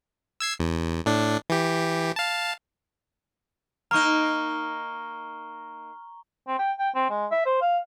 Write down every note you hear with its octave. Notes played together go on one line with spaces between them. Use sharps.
E6 G#6 C7
E2
A2 D4
E3 G4
F5 A5
A#3 D#4 A#5 C#6 F6 G7
C4
G5
G5
C4
G#3
E5
C5
F5